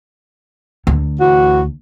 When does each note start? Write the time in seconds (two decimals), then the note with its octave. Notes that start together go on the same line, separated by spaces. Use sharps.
0.87 D2
1.20 A2 E3 F#4